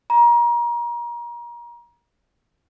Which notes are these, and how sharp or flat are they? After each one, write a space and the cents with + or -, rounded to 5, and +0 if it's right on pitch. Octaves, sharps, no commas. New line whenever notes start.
A#5 +30